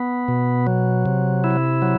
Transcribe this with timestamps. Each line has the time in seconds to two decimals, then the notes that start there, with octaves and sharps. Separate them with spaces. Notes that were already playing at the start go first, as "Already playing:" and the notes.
Already playing: B3
0.28 B2
0.67 F#3
1.06 C3
1.44 E4
1.82 F#3